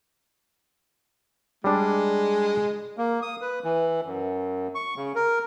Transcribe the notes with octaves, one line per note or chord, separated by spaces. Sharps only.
G3 G#3 D4
A#3
D#6
B4
E3
F#2
C#6
C#3
A#4